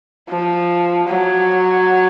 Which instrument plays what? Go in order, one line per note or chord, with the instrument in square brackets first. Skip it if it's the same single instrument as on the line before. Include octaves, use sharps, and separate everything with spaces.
[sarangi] F3
F#3